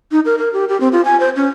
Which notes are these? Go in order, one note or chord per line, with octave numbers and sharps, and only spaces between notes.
D#4
A#4
A#4
G4
G4
C4
F4
G#5
C5
C#4